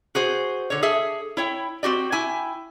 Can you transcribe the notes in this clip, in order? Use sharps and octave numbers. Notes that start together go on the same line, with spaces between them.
F#4 G#4 C5
D3 C#5
G#4 A4 E5
E4 C#5 G5
C4 F#4 G4 D5
E4 G5 G#5